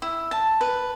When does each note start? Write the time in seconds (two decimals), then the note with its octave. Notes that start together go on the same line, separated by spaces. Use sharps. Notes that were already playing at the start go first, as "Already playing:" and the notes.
0.02 E4
0.31 A5
0.61 B4